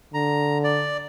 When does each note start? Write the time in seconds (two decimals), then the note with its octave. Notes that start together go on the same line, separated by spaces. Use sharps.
0.14 D3 A#5
0.64 D5